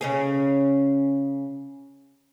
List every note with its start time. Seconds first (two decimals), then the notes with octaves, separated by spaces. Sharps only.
0.01 C#3 C#4 G#4